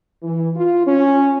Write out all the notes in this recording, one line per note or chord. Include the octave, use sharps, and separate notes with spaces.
E3
F4
C#4